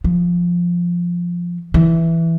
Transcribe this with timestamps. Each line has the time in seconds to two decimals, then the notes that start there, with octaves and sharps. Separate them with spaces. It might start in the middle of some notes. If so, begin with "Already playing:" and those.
0.04 F3
1.74 E3